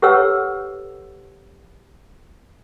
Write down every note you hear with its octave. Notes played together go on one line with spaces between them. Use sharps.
G4 A4 B4 C#5 F#5 E6